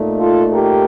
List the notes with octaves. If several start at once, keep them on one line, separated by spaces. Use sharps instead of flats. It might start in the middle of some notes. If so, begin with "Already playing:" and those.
Already playing: A#2 A3 D#4
F4 A4
G4 A#4